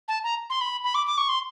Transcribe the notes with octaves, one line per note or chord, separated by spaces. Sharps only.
A5
A#5
C6
B5
B5
D6
D6
C#6
C6